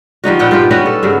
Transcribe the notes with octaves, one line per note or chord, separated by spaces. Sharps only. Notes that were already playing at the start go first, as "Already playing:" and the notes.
F3 G3 D#4 F#4
A#2 B3 F#5 G5
G2 F4 G4
G3 B3 C#4 F#4
A4
G2 C#3 F#3